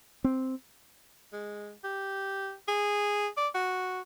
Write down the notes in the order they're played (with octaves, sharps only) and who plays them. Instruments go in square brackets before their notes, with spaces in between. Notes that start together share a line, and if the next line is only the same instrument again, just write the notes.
[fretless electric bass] C4
[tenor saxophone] G#3
G4
G#4
D5
F#4